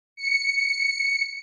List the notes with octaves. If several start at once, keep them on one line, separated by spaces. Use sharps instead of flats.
C#7